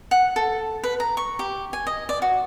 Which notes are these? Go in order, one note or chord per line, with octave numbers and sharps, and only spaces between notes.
F#5
A4
B4
A#5
C#6
G4
G#5
D#5
D5
F#4